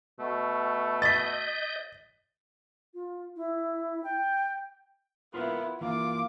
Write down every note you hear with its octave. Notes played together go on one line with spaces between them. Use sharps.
B2 A3
D#5 G6 A6 B6
F4
E4
G5
B3 E4 F4 A#4 B4
E3 A#3 F4 D6